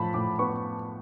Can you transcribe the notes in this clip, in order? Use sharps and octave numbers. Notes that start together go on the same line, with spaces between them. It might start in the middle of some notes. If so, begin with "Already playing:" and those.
Already playing: A2 F3 A5 B5
A2 D6
B3 C#6